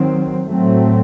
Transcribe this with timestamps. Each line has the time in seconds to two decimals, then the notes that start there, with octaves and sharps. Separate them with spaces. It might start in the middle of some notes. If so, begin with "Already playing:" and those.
Already playing: D#3 F#3 C4
0.47 A2 F#3 A3 C4